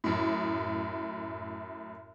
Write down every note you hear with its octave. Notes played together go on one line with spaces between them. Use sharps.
F#2 A2